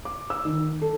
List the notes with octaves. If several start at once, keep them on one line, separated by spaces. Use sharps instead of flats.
D6
E6
D#3
A4